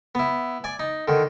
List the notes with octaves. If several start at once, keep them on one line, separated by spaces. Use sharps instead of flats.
B3 E4
D5 G#5
D#4
D3 D#3